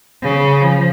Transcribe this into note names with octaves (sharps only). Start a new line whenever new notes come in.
C#3
F3